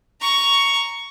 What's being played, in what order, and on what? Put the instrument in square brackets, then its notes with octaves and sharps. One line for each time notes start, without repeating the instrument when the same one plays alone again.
[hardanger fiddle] A#5 C#6